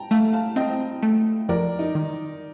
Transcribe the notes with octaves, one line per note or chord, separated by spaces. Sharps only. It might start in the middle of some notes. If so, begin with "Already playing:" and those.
Already playing: G5 A5 A#5
A3 F5 A5
F5 A5
C4 D#5 G5
A3
F2 A#4 D5
D#4
D#3